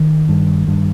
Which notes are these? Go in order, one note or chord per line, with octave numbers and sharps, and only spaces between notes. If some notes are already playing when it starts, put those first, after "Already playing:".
Already playing: D#3
G2
G2